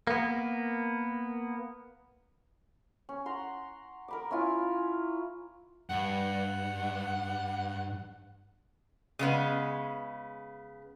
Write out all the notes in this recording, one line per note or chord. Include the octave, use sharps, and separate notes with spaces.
A#3 B3
C#4
F#5 A#5 C6
A#4 B5 D6
C#4 E4 F4 G#5
G2 F#5
C#3 G#3 B3